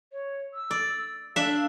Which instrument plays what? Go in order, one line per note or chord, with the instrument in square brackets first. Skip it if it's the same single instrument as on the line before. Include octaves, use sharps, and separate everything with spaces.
[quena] C#5
E6
[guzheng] D5
[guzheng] D4 E5 [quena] F5